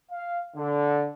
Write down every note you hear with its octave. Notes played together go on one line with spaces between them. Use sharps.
F5
D3